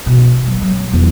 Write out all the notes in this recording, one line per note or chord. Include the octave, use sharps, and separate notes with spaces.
B2
F#3
F#3
E2